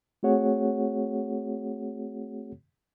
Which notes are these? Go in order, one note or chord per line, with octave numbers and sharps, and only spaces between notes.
A3 C4 F#4 G#4 C#5 F#5